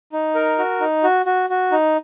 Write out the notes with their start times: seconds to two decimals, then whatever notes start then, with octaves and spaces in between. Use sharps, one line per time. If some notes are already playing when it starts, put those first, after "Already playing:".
0.12 D#4
0.35 A#4
0.59 F#4
0.80 D#4
1.03 F#4
1.26 F#4
1.50 F#4
1.71 D#4